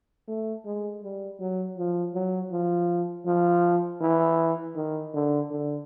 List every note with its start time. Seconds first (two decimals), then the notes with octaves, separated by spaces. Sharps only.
0.28 A3
0.66 G#3
1.03 G3
1.40 F#3
1.78 F3
2.14 F#3
2.51 F3
3.26 F3
4.01 E3
4.75 D#3
5.14 D3
5.51 D3